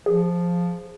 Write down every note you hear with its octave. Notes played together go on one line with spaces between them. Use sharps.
F3 G#4